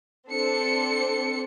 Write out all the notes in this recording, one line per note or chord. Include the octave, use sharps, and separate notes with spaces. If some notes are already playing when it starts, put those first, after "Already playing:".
C4 D4 A4 C5 C#7